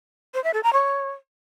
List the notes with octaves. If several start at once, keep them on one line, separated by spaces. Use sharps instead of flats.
C5
E5
A4
A#5
C#5